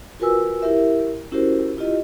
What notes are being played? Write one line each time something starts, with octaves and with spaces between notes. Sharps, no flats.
F4 F#4 A#4 B4 G#5 E6
E4 G4 A#4 E5
C#4 E4 F#4 G4 A#4 C5
E4 F4 G4 D#5